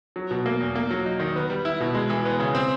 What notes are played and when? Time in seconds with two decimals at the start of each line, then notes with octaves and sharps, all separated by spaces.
0.16 F#3
0.31 B2
0.46 A#3
0.60 E2
0.76 A#3
0.91 F#3
1.06 D#4
1.20 D#3
1.36 B3
1.50 G3
1.65 E4
1.80 B2
1.95 G#3
2.10 E3
2.25 B3
2.40 C#3
2.55 C4